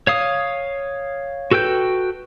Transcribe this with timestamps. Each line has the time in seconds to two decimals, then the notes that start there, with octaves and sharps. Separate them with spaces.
0.07 C#5 F5 D#6
1.51 F#4 A4 B4 G5 G6